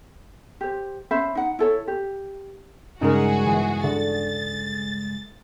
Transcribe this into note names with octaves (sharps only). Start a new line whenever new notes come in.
G4 C5
C#4 C5 E5 B5
D#4 F#5
E4 A4 C#5
G4
G2 C#3 G#3 D#4 F#4 G#4 A#4
E3
D3 A6